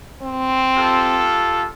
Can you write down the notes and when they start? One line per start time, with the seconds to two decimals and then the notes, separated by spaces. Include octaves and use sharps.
0.22 C4
0.77 F4 G4 A4